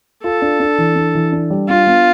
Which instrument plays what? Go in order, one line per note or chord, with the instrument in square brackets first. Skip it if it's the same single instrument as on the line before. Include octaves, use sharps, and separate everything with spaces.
[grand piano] F4 [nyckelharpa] A4
[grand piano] D4
D4
E3
D4
E3
D4
G3
[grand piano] D4 [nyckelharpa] F4
[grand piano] B3